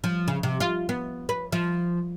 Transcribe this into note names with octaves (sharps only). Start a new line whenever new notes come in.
F3
C#3
C3
F4
B3
B4
F3